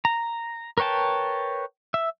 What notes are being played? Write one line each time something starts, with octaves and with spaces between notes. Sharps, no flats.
A#5
A#4 B4 C#5 G5 A5
E5